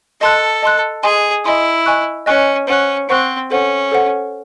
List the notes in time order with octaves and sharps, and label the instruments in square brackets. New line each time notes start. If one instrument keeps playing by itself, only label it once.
[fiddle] A4 [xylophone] D#5 A5 C6 F#6
[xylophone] D#5 A5 C6 F#6
[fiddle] G#4 [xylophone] D#5 G#5 C6 D#6
[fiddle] E4 [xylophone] D#5 G#5 C6 D#6
[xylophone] D#5 G#5 C#6 F#6
[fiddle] C#4 [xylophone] D#5 G#5 C#6 F#6
[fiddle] C#4 [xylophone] C5 F#5 C#6 F#6
[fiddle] C4 [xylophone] C5 F#5 C#6 F#6
[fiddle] C#4 [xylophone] A4 C5 F#5
[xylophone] A4 C5 F#5